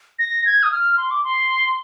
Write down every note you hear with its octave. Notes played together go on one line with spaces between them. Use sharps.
A#6
G#6
D#6
F6
C6
D6
C6